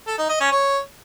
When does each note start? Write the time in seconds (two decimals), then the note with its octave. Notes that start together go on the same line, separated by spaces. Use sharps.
0.07 A4
0.18 D#4
0.29 D#5
0.40 C#4
0.52 C#5